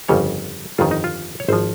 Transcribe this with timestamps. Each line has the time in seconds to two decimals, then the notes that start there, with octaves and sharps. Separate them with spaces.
0.08 G1 F2 C#3 G3 C#5
0.78 G1 F2 D#3 F4
0.91 D#4
1.04 F4
1.40 C#5
1.48 G#1 F3 C5